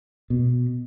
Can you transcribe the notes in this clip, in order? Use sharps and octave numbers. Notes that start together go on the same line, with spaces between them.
B2